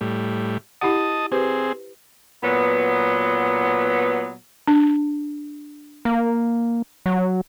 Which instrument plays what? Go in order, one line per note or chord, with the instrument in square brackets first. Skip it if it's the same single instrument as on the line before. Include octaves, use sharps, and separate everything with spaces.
[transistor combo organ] A2 G3
[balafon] E4 G4 F#5 [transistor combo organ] D#5 A5 D#6
[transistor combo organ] C4 G#4 [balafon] G4 B4 C5
[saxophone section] A#2 F#3 B3
[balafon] D4
[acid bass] A#3
F#3